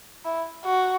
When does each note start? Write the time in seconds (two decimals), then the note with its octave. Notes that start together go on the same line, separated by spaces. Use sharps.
0.25 E4
0.65 F#4